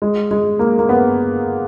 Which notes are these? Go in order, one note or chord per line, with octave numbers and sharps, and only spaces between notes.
G#3
G#3
A#3
A#3
B3